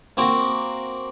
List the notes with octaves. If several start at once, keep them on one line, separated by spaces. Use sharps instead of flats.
A#3 C4 F#4